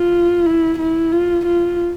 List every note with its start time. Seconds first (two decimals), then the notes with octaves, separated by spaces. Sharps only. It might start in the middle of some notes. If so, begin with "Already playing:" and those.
Already playing: F4
0.46 E4
0.79 E4
1.12 F4
1.45 F4